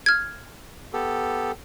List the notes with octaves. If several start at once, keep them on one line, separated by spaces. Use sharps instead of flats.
F6 G#6
B3 G4 A4